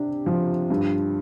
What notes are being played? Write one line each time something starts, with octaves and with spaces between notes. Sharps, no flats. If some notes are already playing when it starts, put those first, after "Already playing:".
Already playing: C3 D4 G4
F3
G2